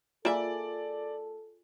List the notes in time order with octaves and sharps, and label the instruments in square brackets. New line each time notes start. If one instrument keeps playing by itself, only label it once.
[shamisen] A#3 E5 [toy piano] F4 G#4 G#5 [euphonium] A4 [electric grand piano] D5